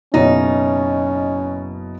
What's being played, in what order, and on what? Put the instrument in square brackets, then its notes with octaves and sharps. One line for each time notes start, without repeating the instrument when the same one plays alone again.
[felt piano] F#1 B2 C#5 [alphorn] C#4 [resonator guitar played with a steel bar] D#4